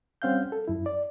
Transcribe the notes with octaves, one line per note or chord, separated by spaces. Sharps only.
G3 C4 C#4 F5 F#5 G6
A4
F#2 E4
D5